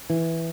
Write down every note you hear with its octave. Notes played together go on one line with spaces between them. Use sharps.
E3